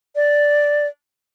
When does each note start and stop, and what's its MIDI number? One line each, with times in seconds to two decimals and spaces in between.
0.16 0.87 74